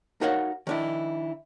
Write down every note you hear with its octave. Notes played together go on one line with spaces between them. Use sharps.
D#4 F#4 A#4 C#5 F5 F#5
D#3 D4 E4